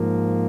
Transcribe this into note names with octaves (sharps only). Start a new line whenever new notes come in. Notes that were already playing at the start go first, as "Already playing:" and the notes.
Already playing: G#2 F3 A#3